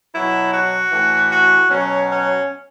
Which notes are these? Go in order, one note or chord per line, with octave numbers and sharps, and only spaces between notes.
B2 F#3 E4
F#4
A2 E3
F#4
B2 F#3 C#4
C#4